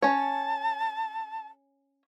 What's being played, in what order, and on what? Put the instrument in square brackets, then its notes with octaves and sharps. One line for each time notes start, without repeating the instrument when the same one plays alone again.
[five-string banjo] C#4 C#5 [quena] A5